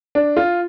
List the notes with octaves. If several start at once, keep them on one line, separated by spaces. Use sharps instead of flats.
D4
F4